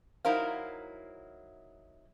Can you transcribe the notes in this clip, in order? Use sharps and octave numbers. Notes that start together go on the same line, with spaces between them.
F#3 D#4 E4 A#4 C5 F5